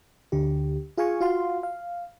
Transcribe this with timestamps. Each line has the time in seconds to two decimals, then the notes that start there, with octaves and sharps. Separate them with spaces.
0.32 D2 D3 G4
0.97 F4 G#4 F5 G#5 C#6
1.21 F4 F#4 F5 C6
1.63 F5